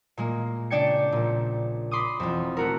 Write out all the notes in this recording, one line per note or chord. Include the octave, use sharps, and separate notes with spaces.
A#2 G#3 A#3
C#3 D4 D5 G5 G#6 C#7
A#1 A#2
B5 C6 D6 D#6
E1 F2
A3 F#4 A#4